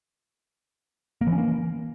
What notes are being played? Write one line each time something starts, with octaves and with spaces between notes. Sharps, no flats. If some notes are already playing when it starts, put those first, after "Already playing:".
A#3
E3
C#4
A#3